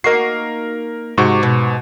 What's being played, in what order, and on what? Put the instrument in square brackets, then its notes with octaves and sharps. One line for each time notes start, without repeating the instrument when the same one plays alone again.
[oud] A#3 D#4 F#4 [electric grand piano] A#4 C7
[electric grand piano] G#2 F#4 C#6 [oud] C3 G4
[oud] B2